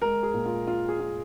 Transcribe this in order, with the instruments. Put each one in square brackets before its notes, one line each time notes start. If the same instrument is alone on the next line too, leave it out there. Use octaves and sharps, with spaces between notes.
[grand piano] G#3 A#4
G#4
A#2
F4
F4
G#4
F4